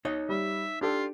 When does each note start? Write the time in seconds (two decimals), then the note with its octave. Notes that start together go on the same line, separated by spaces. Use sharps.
0.05 D#4 C#5 D#5
0.29 G3 E5
0.81 D4 F4 G4 A4